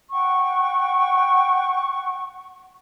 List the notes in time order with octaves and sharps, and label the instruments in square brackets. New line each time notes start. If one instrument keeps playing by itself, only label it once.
[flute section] F#5 G5 C#6